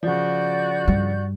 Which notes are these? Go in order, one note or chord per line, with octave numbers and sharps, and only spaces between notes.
C#3 F3 F#4 D5 G6
G2 G3